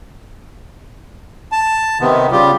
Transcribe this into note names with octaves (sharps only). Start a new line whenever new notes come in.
A5
C3 D#3 B3
C#3 G3 F4 G4